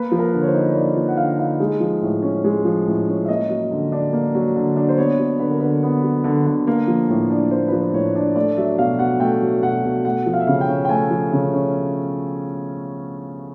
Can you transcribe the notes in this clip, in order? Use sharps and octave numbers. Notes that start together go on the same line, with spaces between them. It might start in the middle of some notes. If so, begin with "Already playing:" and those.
Already playing: A#3 B4
F3
A#4
D3
C#5
C5
D#4
C#5
A#3 D5
F3
F#5
D3 F5
D#4 F5
G#3
F3
A2
C#4
G#3
F3
A2
C#4
E5
A#3 D#5
F#3
D3
D4
A#3
F#3
D3
D4
C5
B3 C#5
F#3
D3 B4
A#4
D3 B4
B3
F#3
D3
D3
A#3
F3
A2
D4
A#3 C5
F3 B4
C5
A2 C#5
D4
A3 D5
F#3 E5
B2 F5
B2 F#5
A3 G5
F#3
B2 F#5
B2
A3 F#5
F3
F5
E5
C#3 F5
G5
C#4
G5
A3 G#5
F3
C#3
C#4